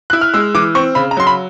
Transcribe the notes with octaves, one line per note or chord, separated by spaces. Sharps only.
E4 F#6
F6
G#3 E6
E3 D6
C4 C#6
C#3 B5
A#5
F#3 C6
B5